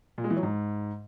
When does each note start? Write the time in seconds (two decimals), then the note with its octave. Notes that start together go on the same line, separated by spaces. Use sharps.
0.18 A#2
0.24 G#3
0.30 E3
0.37 F#3
0.43 G#2